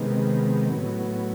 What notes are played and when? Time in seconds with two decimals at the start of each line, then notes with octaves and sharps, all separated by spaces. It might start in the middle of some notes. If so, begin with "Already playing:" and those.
Already playing: C3 D#3 G#3 B3
0.70 A2 F#3 B3